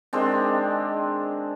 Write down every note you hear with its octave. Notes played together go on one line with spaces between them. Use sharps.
D#3 G#3 C4 D4